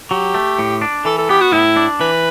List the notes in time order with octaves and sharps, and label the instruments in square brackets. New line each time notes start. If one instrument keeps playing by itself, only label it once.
[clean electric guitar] F#3 [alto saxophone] G4
[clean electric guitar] A3
A2
D4
[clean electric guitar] E3 [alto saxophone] A4
[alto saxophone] A4
[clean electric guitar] B3 [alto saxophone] G4
[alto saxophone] F#4
[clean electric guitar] A2 [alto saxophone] E4
[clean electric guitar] D4
[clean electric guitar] E3 [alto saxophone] B4